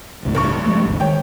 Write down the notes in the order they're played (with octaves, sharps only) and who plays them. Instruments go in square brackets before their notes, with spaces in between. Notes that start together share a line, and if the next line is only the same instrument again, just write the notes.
[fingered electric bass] D#1 C#2 A2
[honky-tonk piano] A1 G2 C#6
[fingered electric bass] F3 G#3 A3
G#1 D#2 D3
[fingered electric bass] D#3 G#3 [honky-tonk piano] C#5 G5